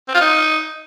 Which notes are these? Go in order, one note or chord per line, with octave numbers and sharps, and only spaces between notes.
C4
F4
D#4